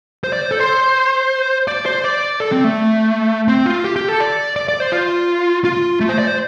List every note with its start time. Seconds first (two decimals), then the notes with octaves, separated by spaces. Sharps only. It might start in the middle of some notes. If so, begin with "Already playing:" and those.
0.24 C5
0.33 D5
0.42 C5
0.51 A4
0.59 C5
1.68 D5
1.86 C5
2.04 D5
2.40 A4
2.52 C4
2.64 A3
3.48 C4
3.66 F4
3.84 G4
3.96 G4
4.08 A4
4.20 D5
4.56 D5
4.68 D5
4.80 C5
4.92 F4
5.65 F4
6.01 A3
6.09 C5
6.18 D5
6.27 C5